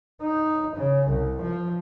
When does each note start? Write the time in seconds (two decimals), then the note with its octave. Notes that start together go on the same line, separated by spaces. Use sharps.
0.22 D#4
0.76 C#3
1.08 C2
1.42 F3